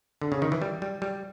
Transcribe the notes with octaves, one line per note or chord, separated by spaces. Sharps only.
D3
C#3
D#3
E3
G3
G3
G3